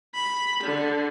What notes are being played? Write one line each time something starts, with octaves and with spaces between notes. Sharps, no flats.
B5
D3